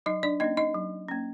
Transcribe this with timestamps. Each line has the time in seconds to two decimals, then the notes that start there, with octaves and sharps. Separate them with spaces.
0.06 F#3 D#4 D#5
0.23 D4 D5
0.40 A#3 D#4 D#5
0.44 C#4
0.57 D#4 D#5
0.74 F#3
1.08 A#3 C#4